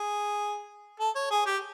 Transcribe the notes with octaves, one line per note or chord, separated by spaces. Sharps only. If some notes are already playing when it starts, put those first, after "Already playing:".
Already playing: G#4
A4
C#5
G#4
G4